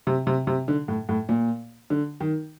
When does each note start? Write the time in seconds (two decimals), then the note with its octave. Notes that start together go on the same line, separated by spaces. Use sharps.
0.07 C3
0.27 C3
0.47 C3
0.68 D3
0.88 A2
1.09 A2
1.29 A#2
1.90 D3
2.20 D#3